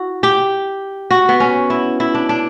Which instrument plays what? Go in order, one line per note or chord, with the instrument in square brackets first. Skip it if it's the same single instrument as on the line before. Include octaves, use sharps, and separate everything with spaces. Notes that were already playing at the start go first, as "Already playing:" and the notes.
Already playing: [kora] E4 F#4
G4
F#4
B3
C#4
E4
E4
D4
D4